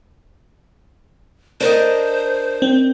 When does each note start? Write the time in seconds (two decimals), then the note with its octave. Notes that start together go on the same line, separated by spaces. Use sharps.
1.60 D4 A#4 C5 D#5
2.62 C4